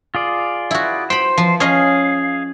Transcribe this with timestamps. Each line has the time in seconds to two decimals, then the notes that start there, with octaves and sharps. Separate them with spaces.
0.15 F4 G#4 D5
0.71 E4 F#4
1.10 C5 G5 B5
1.37 F3
1.60 C#4 G#4 D#5 F5